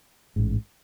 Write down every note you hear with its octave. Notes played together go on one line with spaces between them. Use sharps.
A1 G#2